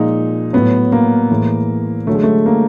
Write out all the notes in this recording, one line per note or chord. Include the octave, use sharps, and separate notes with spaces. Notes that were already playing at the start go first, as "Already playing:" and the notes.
Already playing: A#2 F3 G#3 D#4
A2 F#3 B3
A#3
A2 E3 G#3
D3 F#3 A3
G#3
A3
A#3